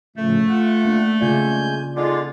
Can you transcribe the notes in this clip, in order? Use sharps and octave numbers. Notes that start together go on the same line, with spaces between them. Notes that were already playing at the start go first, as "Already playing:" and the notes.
A2 C#3 F3 A3
F4 F#5
A#3 D4
C#3 G#3 F4 D5 G#5 G6
D3 G#3 D#4 F4 G#4 D5